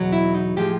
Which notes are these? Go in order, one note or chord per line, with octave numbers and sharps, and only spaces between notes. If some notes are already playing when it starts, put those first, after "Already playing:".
Already playing: E2 B2 F#3
E4
D#4
A2 F3 G#3 G4